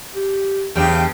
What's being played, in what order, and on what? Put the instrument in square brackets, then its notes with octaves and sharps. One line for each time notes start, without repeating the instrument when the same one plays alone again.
[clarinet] G4
[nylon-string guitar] E2 [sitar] G2 C#3 G4 [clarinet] G5